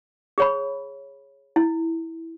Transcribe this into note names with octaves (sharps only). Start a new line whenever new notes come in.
G#4 C#5 B5
E4